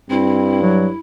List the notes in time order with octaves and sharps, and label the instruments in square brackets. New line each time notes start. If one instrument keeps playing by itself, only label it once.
[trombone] G2 [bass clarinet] C4 [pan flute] E4
[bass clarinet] F#3